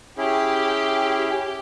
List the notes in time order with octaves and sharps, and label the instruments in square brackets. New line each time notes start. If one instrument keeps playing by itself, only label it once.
[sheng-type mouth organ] C#4 E4 G#4 [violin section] G4